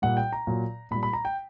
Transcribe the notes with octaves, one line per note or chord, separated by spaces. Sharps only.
A#2 G3 F#5
G5
A#5
A#2 F#3
A#2 G3 B5
B5
A#5
G5